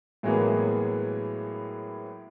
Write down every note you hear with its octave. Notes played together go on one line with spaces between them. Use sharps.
A2 E3 F#3 G#3 A#3 B3